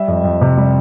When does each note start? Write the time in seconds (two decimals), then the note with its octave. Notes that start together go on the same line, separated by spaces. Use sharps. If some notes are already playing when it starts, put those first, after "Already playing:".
Already playing: G3 E5
0.08 F2
0.24 F2
0.41 C3
0.57 G3